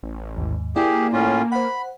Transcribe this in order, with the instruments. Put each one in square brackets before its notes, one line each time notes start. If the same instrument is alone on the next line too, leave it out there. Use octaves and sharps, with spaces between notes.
[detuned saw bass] A1
[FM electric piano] D#2 G#2
[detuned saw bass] A#3 [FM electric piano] E4 D5 [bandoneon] G4 G#4
[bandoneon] A2 C#4 F4
[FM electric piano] C5 F#5 [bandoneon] B5